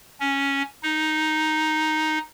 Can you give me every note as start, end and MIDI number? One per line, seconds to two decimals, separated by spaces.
0.20 0.62 61
0.83 2.18 63